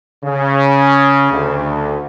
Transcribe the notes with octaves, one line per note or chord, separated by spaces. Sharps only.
C#3
D2